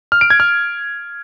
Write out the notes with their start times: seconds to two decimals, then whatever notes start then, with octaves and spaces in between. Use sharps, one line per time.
0.12 F6
0.21 D7
0.30 G#6
0.40 F6